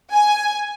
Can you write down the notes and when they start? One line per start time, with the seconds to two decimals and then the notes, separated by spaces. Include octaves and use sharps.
0.12 G#5